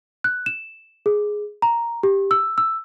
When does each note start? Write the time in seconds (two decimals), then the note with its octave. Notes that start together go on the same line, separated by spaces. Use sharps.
0.24 F#6
0.46 E7
1.06 G#4
1.62 A#5
2.03 G4
2.31 E6
2.58 E6